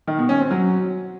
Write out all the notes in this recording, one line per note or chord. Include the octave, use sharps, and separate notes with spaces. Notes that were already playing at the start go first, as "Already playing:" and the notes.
D#3
B2
C#4
C4
F#3